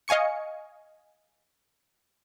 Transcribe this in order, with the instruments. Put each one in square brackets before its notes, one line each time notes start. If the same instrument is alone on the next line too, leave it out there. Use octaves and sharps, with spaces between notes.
[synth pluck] D#5 F5 G#5 C#6 C#7